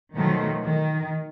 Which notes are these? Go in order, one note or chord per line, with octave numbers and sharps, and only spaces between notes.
B2 D#3 F3 F#3 A3
D#3